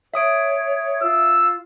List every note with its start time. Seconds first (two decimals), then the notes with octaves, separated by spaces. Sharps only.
0.14 C#5 E5 D#6 D7
1.03 F4 E6